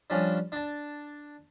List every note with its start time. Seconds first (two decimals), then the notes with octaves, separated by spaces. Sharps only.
0.10 F3 G3 C#4 D4
0.52 D4 A5